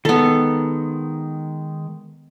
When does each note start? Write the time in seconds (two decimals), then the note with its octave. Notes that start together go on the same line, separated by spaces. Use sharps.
0.05 D#3 G#3 B3 A4